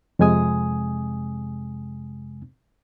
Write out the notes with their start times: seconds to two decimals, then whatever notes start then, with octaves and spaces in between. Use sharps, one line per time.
0.19 F2 C3 G#3 G#5 D#6